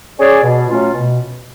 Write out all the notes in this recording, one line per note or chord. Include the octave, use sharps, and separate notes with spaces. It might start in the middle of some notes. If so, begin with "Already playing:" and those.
C#4 G#4 D5
B2
F#3 A3 C#4 F4
B2